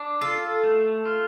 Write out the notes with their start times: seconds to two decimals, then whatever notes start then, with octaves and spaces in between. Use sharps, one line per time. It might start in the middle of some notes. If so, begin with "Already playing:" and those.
Already playing: D4
0.21 F4 A4
0.63 A3
1.05 F4